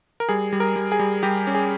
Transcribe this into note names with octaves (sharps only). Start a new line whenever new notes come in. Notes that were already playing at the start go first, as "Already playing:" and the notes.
A#4
G3 G#4
G3
A#4
G3
G#4
G3
G3 G4
C#4
G#4